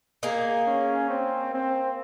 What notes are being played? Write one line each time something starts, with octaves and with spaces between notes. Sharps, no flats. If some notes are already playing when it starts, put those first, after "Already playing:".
A#3 D#4 G#4
C#4
C4
C4